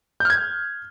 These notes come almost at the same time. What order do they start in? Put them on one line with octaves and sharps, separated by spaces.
G6 F6 G#6